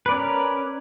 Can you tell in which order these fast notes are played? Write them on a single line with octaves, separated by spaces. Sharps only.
B4 D5 C#4 A#4